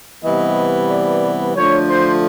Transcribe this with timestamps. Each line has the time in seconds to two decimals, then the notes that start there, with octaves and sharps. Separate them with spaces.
0.23 C3 E3 G3 B3 D#5
0.89 D5
1.56 D3 F3 A3 D4 C#5
1.89 C5